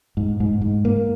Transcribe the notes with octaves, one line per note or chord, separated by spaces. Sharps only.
G#2
G#2
G#2
A#3